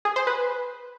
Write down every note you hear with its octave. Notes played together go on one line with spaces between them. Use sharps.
G#4
C5
B4